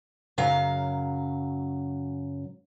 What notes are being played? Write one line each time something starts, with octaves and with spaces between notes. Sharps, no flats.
F#2 C#3 F#3 F5